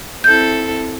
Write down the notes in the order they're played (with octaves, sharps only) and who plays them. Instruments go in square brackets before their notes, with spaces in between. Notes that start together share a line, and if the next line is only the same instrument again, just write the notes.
[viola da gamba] C4 E4 A4 [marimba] G6